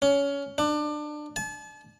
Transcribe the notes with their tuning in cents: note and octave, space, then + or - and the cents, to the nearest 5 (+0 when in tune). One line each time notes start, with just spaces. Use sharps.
C#4 +20
D4 +25
A5 -40